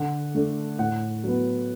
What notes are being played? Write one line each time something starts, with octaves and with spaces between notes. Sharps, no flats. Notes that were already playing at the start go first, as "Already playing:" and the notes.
Already playing: D3 F#5
A3 D4
A2 F#5
F#3 B3